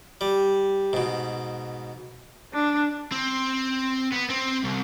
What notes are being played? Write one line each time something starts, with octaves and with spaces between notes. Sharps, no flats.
G3
G#2 B2
D4
C4
B3 B4
C4
C2